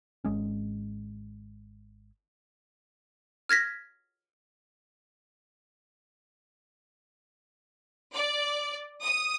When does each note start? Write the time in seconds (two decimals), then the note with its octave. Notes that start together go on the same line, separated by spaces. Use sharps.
0.24 G#1 G#3 C#4
3.49 F6 G#6 A#6 B6
8.13 D5
9.03 D#6